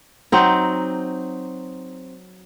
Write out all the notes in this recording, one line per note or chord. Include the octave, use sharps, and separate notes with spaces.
F#3 C4 D#4